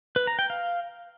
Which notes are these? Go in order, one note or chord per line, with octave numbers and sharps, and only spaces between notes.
B4
A#5
G5
F5